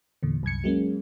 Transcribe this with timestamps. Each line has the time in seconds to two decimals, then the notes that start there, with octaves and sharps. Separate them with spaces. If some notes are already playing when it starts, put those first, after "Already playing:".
0.23 E2 A#2 D3
0.43 C2 F#2 G#6 C#7
0.64 F#3 G#3 A#3 C#4